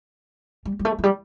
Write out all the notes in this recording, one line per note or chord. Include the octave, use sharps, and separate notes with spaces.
G3
G3
A3
F3
G3